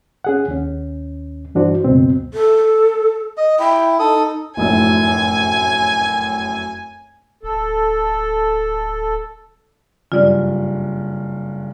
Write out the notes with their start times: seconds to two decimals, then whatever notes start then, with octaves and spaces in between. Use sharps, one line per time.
0.24 C#4 G#4 F#5
0.48 D#2 C#4
1.55 G2 E3 D4 F#4 C5
1.84 C#2 F#2 B2 C4
2.34 A4
3.38 D#5
3.59 E4 G5
3.99 D#4 A4 D#6
4.57 F1 F#2 A2 G#5
7.43 D1 A4
10.12 F#1 G2 F4 D5